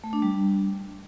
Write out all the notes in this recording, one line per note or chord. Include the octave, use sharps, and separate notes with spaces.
A3
D4
G3